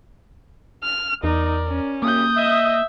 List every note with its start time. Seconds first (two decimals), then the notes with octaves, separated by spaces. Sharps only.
0.83 F6
1.24 E2 D#4 A#4 D5
1.68 C#4
2.02 F#2 C#3 A#3 G4 D#6 G6
2.36 D#5 E5